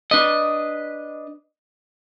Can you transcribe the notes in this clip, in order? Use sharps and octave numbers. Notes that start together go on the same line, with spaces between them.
D4 B4 D#5